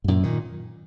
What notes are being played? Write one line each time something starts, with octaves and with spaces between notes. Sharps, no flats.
G#2
F#2 A#2
A#2 D#3